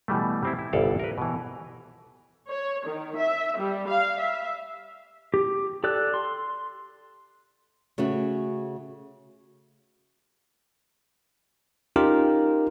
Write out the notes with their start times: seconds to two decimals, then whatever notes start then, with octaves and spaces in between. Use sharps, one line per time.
0.08 B2 E3 G3 A3
0.43 G3 C4 E4
0.59 E4
0.73 G1 C2 A4 D5 F5
0.99 A#4 B4
1.18 B2 E3
2.48 C#5
2.86 D#3
3.16 E5
3.58 G3
3.88 F5
4.19 E5
5.34 G4
5.84 G4 A4 D5 E6 F#6
6.14 C6
7.98 C#3 A3 C#4 F#4
11.96 C#4 D#4 F4 G4 A#4